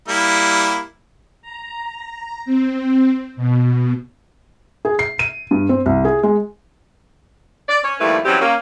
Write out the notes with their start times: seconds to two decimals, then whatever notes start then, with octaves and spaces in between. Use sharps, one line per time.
0.08 G3 A#3 E4
1.42 A#5
2.45 C4
3.36 B2
4.85 G#4
4.99 C7
5.19 D#7
5.51 G2
5.69 C4
5.86 C2
6.05 G#4
6.23 G#3
7.68 D5
7.84 C#4 C#5
8.00 D#2 F3 G3 A3 E4 B4
8.25 E3 F#3 G3 C4 C#4 G4
8.40 A#3 C#4